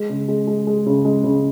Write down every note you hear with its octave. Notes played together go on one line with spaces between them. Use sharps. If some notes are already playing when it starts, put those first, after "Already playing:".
Already playing: G#3
C#3
G#3
G#3
G#3
C#3
G#3
C#3